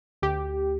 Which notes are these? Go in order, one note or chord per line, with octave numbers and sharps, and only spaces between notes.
D2 G4